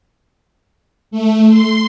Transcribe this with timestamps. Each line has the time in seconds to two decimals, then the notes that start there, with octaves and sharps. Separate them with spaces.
1.11 A3
1.49 C6